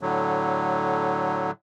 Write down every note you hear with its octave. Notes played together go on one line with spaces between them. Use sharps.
A2 D3 F#3